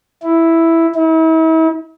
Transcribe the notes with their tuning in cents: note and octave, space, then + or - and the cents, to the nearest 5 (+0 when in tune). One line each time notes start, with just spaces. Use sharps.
E4 +0
E4 -40